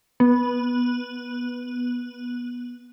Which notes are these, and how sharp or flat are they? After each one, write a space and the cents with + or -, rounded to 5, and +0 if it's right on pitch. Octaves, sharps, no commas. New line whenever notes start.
B3 -10